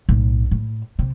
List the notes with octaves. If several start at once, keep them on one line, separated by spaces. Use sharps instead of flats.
B1 A2
A2
C3